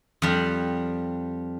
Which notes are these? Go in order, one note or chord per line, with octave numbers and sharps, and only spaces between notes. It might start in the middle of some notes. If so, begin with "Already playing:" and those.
F2 G3